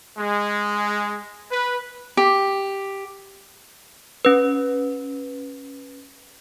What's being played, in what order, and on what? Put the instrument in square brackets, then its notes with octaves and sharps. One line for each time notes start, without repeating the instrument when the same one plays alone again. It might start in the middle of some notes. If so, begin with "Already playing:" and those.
[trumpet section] G#3
B4
[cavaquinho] G4
[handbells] C#4 B4